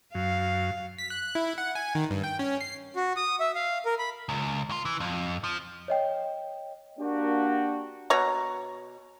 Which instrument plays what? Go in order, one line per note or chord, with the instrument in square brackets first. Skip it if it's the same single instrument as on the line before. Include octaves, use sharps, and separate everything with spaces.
[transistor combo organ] F#2 [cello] F5
[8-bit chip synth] B6
F#6
E4
F#5
G#5
D#3
G2
G5
C#4
C7
[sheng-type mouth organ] F#4
D#6
E5
F5
A#4
B5
[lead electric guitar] C#2
D#2 F4
E3
F2
F3
[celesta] C#5 D#5 G5
[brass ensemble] A#3 D4 F#4 G4
[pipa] B2 C#5 F#5 A#5